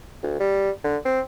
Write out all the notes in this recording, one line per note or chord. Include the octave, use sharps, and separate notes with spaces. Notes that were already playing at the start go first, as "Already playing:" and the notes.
D2
G3
D3
C4